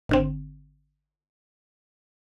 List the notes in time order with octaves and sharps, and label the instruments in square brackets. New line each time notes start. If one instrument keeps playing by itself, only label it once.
[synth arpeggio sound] G#1 D3 C4